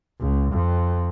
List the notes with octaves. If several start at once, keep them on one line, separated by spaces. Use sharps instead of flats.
C#2
F2